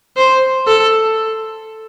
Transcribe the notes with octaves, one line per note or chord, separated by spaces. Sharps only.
C5
A4